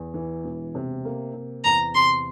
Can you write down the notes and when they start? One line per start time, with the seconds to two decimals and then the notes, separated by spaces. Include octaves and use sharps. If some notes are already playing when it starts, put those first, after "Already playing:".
Already playing: E2
0.14 E3
0.44 E1
0.75 C3
1.05 A#3
1.34 C3
1.64 E2 A#5
1.94 C3 C6